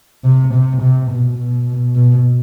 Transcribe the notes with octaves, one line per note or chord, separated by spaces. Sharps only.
C3
C3
C3
B2
B2
B2